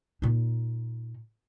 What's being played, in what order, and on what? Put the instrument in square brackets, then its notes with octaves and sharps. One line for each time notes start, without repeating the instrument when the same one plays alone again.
[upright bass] A#2 D#4